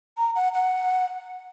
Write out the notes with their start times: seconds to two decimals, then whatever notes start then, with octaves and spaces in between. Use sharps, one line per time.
0.18 A#5
0.36 F#5
0.54 F#5